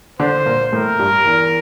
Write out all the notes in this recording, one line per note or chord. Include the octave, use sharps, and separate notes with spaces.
D3 D4 C5
A#2 A#3
A2 A3 A#4
G2 G3
E2 E3